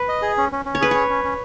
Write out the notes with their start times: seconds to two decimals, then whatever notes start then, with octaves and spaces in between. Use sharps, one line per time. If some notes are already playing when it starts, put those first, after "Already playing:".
Already playing: B4
0.09 D#5
0.22 G#4
0.38 C#4
0.52 C#4
0.65 C#4
0.75 C#5
0.80 G#4 B4
0.91 C#4 C#5
1.10 C#4
1.24 C#4